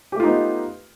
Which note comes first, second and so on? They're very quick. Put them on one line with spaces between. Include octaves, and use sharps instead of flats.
G4 A3 F4 D#4 B3